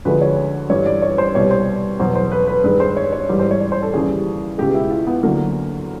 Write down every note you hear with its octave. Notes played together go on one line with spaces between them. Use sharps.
D2 D3 F3 G#3 B4
C#5
G2 E3 G3 C#5
D5
C#5
C5
C2 B2 G3 C#5
C5
E2 B2 F#3 C5
C5
B4
B4
G2 D#3 G#3 B4
C5
C#5
C#5
G#2 E3 G3
C5
C#5
C#5
C5
A4
D#2 C#3 E3 G3 G#4
C#2 B2 G#3 G4
E4
F4
B3
D2 D3 F#3 A#3